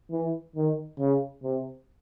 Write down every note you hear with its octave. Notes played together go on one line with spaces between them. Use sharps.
E3
D#3
C#3
C3